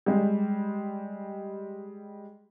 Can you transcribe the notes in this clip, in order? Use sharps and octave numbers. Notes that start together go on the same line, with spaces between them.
G3 G#3